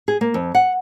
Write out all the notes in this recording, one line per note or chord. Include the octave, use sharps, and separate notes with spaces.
G#4
A#3
F2
F#5